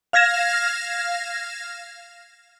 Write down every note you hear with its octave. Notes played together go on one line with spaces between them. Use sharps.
F5 F6 G#6 A#6 E7